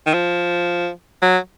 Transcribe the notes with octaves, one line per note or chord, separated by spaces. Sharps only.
D#3
F3
F#3